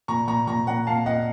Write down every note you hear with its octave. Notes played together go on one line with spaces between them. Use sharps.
A#2 A#5 C#6
A#2 A#5 C#6
A#2 A#5 C#6
A#2 F#5 A#5
A#2 F5 A5
A#2 D#5 F#5